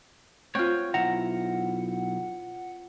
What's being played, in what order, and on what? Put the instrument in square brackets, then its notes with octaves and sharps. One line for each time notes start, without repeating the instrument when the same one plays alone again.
[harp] C4 F4 [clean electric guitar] C#5 F#5
[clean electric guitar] B1 E4 A#5 [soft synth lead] F#5